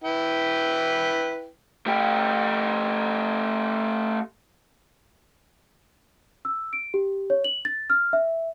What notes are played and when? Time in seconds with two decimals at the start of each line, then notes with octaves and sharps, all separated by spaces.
0.04 E4 B4 G5
1.86 A3 G4
6.45 E6
6.73 D7
6.94 G4
7.30 C#5
7.44 F#7
7.65 A6
7.90 F6
8.13 E5